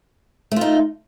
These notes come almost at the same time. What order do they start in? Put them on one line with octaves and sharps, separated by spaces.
A3 F4 D#4